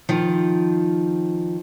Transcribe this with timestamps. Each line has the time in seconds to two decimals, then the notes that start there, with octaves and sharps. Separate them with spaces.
0.09 D#3 F3